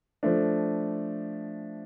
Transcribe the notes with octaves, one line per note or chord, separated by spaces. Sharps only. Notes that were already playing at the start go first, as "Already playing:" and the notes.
F3 A3 D4